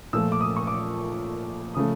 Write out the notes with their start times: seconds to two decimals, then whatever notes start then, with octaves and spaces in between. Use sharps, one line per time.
0.13 A#2 F3 A3 E6
0.32 D6
0.41 D#6
0.56 C#6
0.67 D6
1.74 C#3 F3 A3 D#6